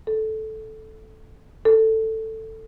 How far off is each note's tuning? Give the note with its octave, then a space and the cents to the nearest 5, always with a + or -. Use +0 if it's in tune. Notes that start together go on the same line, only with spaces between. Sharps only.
A4 -10
A4 +10